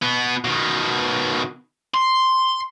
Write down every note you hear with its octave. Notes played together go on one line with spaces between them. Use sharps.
B2 B3
B2 D#3
C6